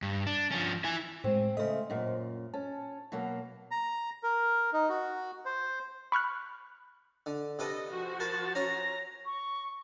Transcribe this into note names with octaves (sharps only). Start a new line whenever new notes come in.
G2
D4
F3 C#4
E4 G#5
A2 G#3 C4
C#3 A3 C5 D#5
F#2 A#2
C#4 A5
B2 F#3 A#3
A#5
A#4
D#4
F#4
C5
B5 C#6 F6 F#6
D3
C3 A4 B4 D#5
F3 F#4
A#4 A5 B5
C#4 C#5 A#5
C#6